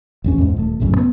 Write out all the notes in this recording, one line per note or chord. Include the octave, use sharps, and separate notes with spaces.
A1 E2 C#4
E2 G#2
D#1 A3
A#1 F#2 A2 C#3
B3